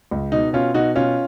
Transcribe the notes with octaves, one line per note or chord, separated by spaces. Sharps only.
C#2
B2 D#4
B2 C#4 F4
B2 D#4 F#4
B2 C#4 F4